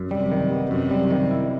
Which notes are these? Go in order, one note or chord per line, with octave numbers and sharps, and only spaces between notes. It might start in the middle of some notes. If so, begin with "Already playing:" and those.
Already playing: F#2
C3 G3
D#3
B3
F#2 C3
G3
D#3
E4